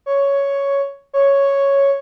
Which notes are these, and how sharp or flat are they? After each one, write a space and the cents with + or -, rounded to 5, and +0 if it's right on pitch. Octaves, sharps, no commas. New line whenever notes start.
C#5 +5
C#5 +0